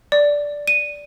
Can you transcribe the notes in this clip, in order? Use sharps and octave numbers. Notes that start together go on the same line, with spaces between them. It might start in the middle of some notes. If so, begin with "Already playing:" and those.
D5
D#7